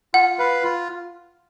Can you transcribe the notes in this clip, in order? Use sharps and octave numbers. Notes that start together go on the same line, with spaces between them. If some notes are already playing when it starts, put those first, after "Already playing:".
F4 F#5
B4 F5
F4